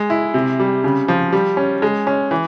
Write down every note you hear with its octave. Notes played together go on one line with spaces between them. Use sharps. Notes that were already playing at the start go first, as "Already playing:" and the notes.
Already playing: G#3
E4
C3
G3
C#3
F3
G3
C#4
G#3
C#4
E3